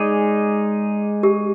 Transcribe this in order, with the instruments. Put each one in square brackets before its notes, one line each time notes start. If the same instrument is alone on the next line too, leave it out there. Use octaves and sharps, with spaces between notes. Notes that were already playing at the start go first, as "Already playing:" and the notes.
Already playing: [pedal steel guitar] G#3 D#4 G#4 D5
[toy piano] G4